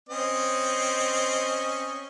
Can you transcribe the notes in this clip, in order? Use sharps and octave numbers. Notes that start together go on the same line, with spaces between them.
C4 C#4 D#5